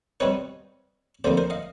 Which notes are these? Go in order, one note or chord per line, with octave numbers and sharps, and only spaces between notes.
B2 G3 C4 D#4 B4 C#5
D2 C3 F3 A#3 D#4 C5 D5
A#4 C5
D#5 F5